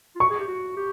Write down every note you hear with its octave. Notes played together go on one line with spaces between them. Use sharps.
F4
F#4 C#6
G#4
G4
F#4
G4